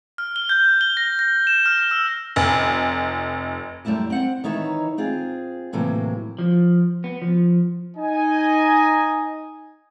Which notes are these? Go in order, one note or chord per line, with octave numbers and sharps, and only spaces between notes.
F6
G7
G6
G7
A#6
A#6
E7
F6
E6
F1
F#2 G3 A3 E4 A5
C4 F#5
D#3 E3 D#4 C#5 E5 A#5
C4 F4 G#4
A2 C3 E3 F#3 A#3
F3
B3
F3
D#4 D#5 G#5